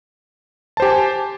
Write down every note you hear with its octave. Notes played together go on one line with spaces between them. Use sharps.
G4 C5 G#5 A5